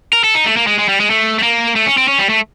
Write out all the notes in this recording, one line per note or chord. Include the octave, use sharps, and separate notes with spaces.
A#4
A4
D#4
A3
A#3
G#3
G#3
G3
G#3
A3
A3
A#3
A3
C#4
C4
C#4
G3
A3